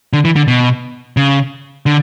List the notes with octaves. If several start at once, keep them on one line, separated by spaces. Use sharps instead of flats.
D3
E3
D3
B2
C#3
D3